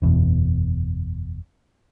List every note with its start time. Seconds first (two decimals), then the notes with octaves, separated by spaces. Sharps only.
0.02 F#1 E2 B2